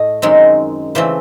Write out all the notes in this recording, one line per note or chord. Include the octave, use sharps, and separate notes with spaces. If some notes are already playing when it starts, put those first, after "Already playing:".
Already playing: A2 A3 D#5
F#2 D#3 G#3 C4
C#3 E3 A3 C4 C5